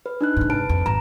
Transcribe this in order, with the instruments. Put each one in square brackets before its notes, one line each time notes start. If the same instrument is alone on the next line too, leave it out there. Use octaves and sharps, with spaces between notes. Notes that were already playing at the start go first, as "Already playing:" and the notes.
[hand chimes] B4
D4 D#4 F#6
[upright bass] G#2 C3
[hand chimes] B4 A5 D7
[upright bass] F2
[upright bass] G#1 [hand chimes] A#5